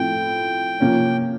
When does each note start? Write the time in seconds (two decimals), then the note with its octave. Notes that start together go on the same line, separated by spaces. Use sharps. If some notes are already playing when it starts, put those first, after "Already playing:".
Already playing: A2 F3 A3 C4 E4 G5
0.80 C3 F3 A#3 C#4